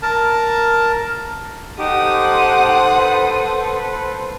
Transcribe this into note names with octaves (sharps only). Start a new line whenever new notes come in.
A#4 A5
D#4 G4 A4 C5 F#5 D#6
B4